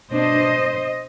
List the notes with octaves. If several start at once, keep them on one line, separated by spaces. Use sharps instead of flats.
B2 B3 D4 C5 D#5